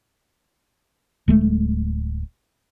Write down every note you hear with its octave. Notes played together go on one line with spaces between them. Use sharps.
D1 G#3 A3